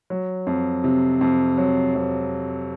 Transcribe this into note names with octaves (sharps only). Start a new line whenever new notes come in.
F#3
F2
C3
F2
F#3
F2